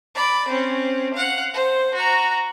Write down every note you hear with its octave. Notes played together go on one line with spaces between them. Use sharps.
D5 B5
C4 C#4
F5 F#5
C5
F#4 A#5